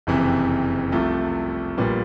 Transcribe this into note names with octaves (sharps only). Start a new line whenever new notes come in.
F#1 F2 C3 E3
C2 C3 F3 A3
A#1 A#2 G3 B3